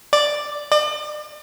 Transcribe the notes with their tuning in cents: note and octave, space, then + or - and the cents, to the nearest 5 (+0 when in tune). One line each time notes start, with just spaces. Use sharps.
D5 +5
D5 +40